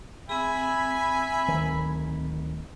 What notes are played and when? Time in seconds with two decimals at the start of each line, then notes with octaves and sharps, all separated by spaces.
0.29 C4 G#4 E5 G#5 B5
1.48 D1 D#3